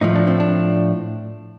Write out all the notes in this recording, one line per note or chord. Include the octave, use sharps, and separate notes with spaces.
A2 F3 D#4
D4
C4
D4